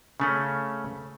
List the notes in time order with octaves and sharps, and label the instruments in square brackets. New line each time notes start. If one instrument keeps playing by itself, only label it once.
[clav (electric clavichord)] C#3 A3 C#4